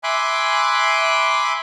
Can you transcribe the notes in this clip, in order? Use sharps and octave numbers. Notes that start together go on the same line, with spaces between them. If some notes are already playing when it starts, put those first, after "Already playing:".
E5 G#5 B5 C6 D6 F#6